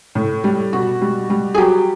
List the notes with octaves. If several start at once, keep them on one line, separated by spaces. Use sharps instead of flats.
A2
G3
B2 F#4
G3
G3
G#4
F#3 G4